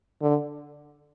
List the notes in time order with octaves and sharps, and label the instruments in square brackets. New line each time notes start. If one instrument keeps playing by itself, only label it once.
[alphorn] D3